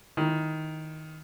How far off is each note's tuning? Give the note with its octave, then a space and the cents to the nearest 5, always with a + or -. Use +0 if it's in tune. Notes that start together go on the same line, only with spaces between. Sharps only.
D#3 +10 E4 +25